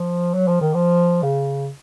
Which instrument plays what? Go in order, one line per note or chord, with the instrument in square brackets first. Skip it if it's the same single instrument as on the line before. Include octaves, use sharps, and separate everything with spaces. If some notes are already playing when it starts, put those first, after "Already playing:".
Already playing: [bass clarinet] F3
F#3
F3
D#3
F3
C#3